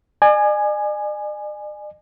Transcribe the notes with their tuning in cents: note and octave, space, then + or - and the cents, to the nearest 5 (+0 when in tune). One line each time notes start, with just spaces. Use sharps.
D5 +45 G#5 +0